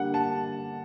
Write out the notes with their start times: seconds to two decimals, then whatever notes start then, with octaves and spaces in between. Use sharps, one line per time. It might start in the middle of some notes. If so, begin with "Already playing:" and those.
Already playing: D3 G3 A#3 F#5
0.14 A5